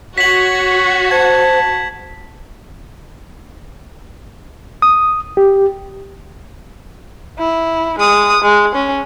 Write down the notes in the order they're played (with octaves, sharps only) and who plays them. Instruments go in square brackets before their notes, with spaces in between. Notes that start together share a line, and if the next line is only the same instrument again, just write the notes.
[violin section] F#4 [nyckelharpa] C#5 [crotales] B6 F#7
[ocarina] C5 [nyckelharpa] A5 [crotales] G#6
[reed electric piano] D#6
G4
[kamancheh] E4
G#3 D#6
G#3
C#4